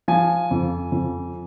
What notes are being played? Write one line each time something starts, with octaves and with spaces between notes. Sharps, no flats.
F3 G#5
F2
F2